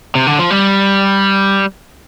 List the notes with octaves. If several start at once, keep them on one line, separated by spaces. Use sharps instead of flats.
C3
D3
F3
G3